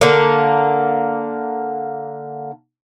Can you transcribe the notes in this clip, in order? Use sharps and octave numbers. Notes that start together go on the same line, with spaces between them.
D3 A#3